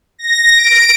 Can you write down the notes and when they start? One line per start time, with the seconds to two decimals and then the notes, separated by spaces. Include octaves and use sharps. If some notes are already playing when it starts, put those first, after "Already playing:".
0.19 A#6
0.54 D7